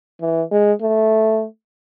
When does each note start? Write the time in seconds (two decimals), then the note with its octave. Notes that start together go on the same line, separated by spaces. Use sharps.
0.21 E3
0.52 G#3
0.82 A3